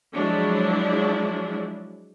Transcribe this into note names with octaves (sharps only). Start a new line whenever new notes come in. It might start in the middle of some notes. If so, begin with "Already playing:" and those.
F3 F#3 G#3 D4 E4